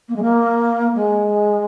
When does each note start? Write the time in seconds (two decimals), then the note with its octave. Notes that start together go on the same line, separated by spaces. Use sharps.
0.08 A#3
0.15 G#3
0.22 A#3
0.94 G#3